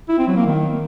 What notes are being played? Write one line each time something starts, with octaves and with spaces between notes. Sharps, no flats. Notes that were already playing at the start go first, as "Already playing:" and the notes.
E4
C4
F#3
A#3
D#3